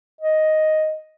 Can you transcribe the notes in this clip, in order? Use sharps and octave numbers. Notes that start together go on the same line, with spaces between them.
D#5